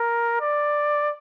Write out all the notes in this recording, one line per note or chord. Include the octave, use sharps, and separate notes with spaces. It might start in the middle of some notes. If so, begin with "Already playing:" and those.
Already playing: A#4
D5